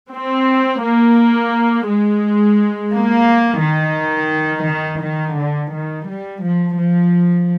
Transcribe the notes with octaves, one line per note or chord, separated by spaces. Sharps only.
C4
A#3
G#3
A#3
D#3
D#3
D#3
D3
D#3
G3
F3
F3